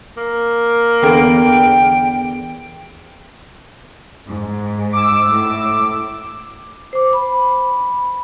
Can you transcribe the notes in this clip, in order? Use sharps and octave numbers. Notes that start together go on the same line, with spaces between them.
A#3
E2 D3 B3 G5
G#2
D6 E6
A2
C5 D6
B5